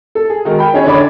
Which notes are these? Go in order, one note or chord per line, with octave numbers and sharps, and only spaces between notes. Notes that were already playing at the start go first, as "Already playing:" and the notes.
A4
G#4
D#3 G#3 D#4 F#4 A#4
G5 B5
C#4 D#4 G#4 C#5
D3 C#5 D5 B5 D6